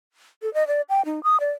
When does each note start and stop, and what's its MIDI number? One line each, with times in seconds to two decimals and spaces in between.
0.42 0.52 69
0.54 0.67 75
0.67 0.81 74
0.89 1.04 79
1.05 1.23 63
1.23 1.40 87
1.40 1.50 74